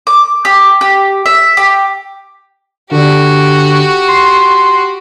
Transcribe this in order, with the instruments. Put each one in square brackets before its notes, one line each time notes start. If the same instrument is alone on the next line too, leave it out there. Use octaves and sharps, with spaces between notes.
[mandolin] D6
G4
G4
E5
G4
[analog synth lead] D3 [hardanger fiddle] F#4 G4
[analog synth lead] C6